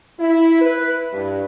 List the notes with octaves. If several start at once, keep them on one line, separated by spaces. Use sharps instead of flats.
E4
B4
G2